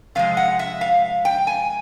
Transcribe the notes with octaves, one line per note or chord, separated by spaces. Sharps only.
C3 F3 G#3 F5
F#5
E5
F5
G5
G#5